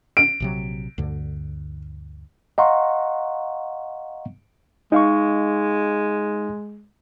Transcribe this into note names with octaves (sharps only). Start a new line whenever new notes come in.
D7
A#1 C3 F#3
D2 G2 D3
D#5 F5 F#5 A#5 C6 C#6
G#3 D#4 F5 C#6